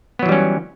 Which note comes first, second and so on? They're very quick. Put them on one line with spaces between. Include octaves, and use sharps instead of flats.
B3 F#3 E3 G3 C#4